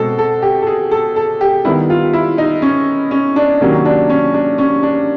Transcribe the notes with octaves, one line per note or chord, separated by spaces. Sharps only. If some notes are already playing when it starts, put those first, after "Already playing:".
Already playing: B2 G#3 C4 A4
A4
G4
A4
G#4
A4
A4
G4
D#3 G3 B3 E4
F4
E4
D#4
C#4
C#4
D4
C3 D#3 F#3 A#3 C#4
D4
C#4
D4
C#4
D4